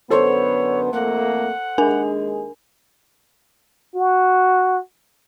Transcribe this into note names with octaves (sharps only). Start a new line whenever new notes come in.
F#2 D3 B3 A4 C5 C#5 C6
F2 A3 A#3 F#5
D#2 G#3 D4 G#4 A#4 G#5
F#4